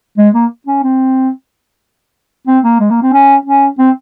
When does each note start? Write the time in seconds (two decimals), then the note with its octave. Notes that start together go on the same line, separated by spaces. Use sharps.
0.18 G#3
0.34 A#3
0.67 C#4
0.83 C4
2.47 C4
2.64 A#3
2.80 G#3
2.90 A#3
3.02 C4
3.13 C#4
3.45 C#4
3.79 C4